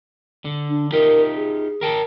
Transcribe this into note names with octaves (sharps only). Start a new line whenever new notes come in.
D3
D4
D#4 F4 G4 A#4
G#4
A#4 G5 A5